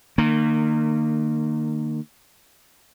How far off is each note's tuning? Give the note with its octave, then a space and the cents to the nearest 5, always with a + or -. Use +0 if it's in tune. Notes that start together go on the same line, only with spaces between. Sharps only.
D#3 -35 A#3 -20